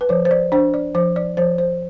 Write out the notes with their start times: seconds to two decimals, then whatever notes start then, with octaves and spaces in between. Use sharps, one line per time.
0.01 B4
0.09 F3 C5
0.25 C5
0.31 D5
0.52 D4 C5
0.74 D5
0.95 F3 C5
1.16 D5
1.37 F3 C5
1.58 C5